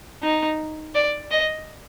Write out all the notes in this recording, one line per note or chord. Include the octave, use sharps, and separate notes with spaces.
D#4
D5
D#5